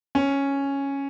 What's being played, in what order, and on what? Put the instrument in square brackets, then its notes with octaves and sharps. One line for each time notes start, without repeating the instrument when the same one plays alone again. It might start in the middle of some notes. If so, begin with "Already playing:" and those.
[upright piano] C#4